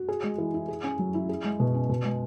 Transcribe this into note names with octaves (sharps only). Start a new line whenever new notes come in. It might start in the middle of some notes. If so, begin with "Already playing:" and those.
Already playing: F#4
G#4
G#3
E3
E4
G#4
C#4
F#3
E4
G#4
G#3
B2
C#4
B2
G#3